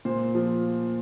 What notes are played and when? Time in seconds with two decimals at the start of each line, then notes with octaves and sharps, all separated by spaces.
0.05 A#2 C5
0.35 F3